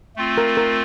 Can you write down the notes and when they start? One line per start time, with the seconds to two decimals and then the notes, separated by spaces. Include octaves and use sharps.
0.16 A3 C4 F4
0.38 A#4
0.57 A#4